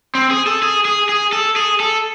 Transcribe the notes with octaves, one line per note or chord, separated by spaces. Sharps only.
C4
G#4
A4
G#4
G#4
G#4
A4
G#4
A4